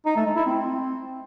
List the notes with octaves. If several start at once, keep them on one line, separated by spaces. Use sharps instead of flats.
D#4
A3
G#3
E4
C4